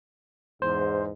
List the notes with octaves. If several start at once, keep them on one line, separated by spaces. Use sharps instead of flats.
E2 G#2 C5